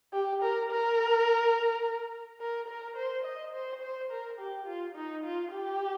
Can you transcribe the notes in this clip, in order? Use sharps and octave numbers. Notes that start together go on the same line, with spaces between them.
G4
A#4
A#4
A#4
A#4
C5
D#5
C5
C5
A#4
G4
F4
D#4
F4
G4